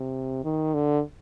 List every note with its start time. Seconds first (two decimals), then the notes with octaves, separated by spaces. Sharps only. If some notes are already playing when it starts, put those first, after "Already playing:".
Already playing: C3
0.44 D#3
0.74 D3